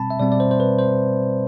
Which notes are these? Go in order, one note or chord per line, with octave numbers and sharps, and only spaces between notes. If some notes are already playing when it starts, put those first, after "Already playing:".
Already playing: B2 G3 C4 A5 B5
E5
B2 G3 C4 D5
D5
C5
C5
B4
C5